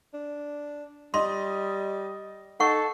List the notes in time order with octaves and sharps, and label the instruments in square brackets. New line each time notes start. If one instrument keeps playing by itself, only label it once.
[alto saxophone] D4
[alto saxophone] G3 [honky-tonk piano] D#5 [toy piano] C6
[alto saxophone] D#4 [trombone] A4 [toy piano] F#5 C#6